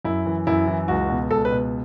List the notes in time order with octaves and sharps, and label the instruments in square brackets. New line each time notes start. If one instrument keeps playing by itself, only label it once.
[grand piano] F#2 E4
E3
F#2 E4
E3
C#2 F#4
B2
C#2 A4
B4
B2